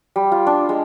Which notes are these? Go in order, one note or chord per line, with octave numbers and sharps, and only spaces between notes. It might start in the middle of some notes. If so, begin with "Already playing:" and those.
G3
F4
D4
G#3